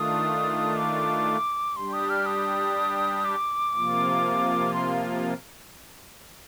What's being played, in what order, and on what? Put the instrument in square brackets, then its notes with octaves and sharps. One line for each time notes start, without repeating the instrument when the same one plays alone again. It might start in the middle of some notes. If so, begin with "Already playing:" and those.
Already playing: [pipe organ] D#3 A3 D4 F4 [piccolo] D#6
[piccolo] D6
[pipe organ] G3 D4 G4 [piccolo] C6
[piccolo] D#6
F6
D#6
D6
[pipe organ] C3 F3 A#3 F4
[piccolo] C6